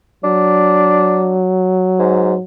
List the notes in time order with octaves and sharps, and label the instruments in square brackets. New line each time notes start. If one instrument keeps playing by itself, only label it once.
[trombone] F#3 [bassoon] D4
[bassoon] G#2